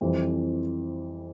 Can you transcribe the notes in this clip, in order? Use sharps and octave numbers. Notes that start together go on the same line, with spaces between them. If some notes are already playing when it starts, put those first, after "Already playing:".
F2 E3 G3 C4 E4